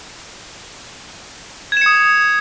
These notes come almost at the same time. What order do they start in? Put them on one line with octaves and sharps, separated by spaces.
G#6 E7 C#7 D#6